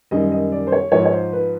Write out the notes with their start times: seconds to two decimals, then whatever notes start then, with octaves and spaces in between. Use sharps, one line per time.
0.11 F#2 D#3 G3 D#5
0.32 D#5
0.52 D5
0.67 C5
0.72 C#5
0.92 G#2 F3 C#5
1.05 C#5
1.13 C5
1.33 B4